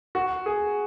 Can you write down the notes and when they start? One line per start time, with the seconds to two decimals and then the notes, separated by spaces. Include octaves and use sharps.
0.15 F#4
0.46 G#4